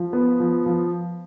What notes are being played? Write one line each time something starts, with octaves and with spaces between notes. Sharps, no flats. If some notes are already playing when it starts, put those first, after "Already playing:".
Already playing: F3
B3
F3
F3